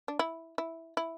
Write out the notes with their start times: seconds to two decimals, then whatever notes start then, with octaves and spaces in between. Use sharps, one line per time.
0.08 D4
0.19 E4
0.58 E4
0.97 E4